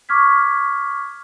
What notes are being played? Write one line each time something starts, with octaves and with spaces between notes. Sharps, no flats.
C#6 D6 F6 G#6 B6